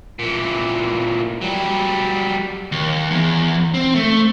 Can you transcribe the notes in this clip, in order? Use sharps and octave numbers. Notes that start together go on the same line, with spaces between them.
A#2 E3
F#3 G3
D#2
E2
C4
A3